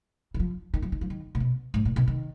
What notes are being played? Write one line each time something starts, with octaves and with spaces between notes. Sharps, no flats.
D#3
F3
D#3
F3
D#3
F3
D#3
A#2
B2
G#2
A#2
B2
D#3